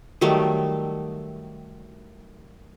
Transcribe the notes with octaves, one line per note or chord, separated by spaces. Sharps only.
D#3 F#3 G3 A3